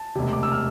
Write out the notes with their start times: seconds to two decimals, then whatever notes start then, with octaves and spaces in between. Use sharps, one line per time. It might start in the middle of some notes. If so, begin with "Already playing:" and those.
Already playing: A5
0.15 E1 D2 C3
0.33 D6
0.43 E6
0.52 F6